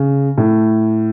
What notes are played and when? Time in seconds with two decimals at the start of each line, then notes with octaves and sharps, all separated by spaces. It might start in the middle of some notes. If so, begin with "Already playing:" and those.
Already playing: C#3
0.38 A2